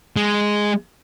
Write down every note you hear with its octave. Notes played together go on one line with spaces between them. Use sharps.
G#3